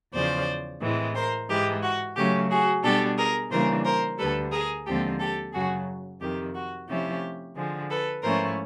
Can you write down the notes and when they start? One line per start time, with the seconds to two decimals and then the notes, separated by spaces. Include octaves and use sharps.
0.14 E2 C#3 F3 C5 D5
0.81 A2 E3 G#3 C4
1.15 A#4 C5
1.49 G#2 E3 G#3 G4
1.83 F#4
2.16 C#3 F#3 A3 C#4 G4
2.50 F#4 G#4
2.83 B2 G3 B3 D4 G4 A4
3.18 G#4 A#4
3.51 C#3 E3 G3 A#3 D4 A#4 C5
3.85 A#4 C5
4.18 D2 D3 G3 A4 B4
4.52 G#4 A#4
4.86 D#2 D3 F3 G#3 C4 G4 A4
5.20 G4 A4
5.53 F#2 C#3 F#3 F#4 G#4
6.20 F2 C3 D#3 G4
6.55 F#4
6.88 C3 F3 A3 C#4 E4 G4
7.56 D3 F3 G#3
7.90 A4 B4
8.23 G#2 F3 A3 C#4 E4 A#4 C5